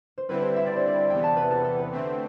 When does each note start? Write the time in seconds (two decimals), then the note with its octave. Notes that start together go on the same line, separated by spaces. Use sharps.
0.18 C5
0.28 D3 G3 C4 E4 B4
0.42 C5
0.56 E5
0.66 D5
0.76 C5
0.87 D5
1.10 E2 C3 E3 B3 G5
1.24 A5
1.36 B4
1.51 A4
1.64 A4
1.78 B4
1.92 D3 A3 C4